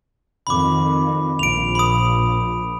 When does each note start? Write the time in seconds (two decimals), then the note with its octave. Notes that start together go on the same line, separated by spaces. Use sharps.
0.47 F2 D#3 B5 D6
1.39 A#1 D7 F7
1.75 B5 D#6